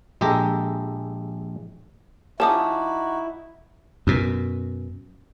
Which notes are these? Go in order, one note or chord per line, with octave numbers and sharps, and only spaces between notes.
A#1 G#3 G4 A4 A#5
F3 C#4 D#4 E4 F#4 A5 D6 D#6
F#2 B2